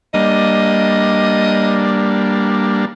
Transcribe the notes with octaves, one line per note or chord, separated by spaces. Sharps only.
G3 A#3 D4 D#5